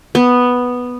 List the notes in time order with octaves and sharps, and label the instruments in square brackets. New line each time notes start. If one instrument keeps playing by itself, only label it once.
[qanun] B3